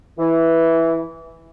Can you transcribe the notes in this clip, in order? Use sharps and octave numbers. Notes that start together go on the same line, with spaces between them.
E3